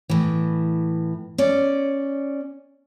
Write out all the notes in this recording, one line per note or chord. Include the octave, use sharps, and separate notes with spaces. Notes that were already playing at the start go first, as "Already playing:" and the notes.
A2 E3
C#4 D5